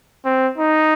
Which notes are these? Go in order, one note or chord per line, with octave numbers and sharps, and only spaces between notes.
C4
D#4